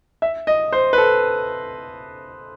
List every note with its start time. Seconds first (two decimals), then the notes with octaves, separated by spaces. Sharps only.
0.22 E5
0.47 D#5
0.73 C5
0.93 B4
0.98 A4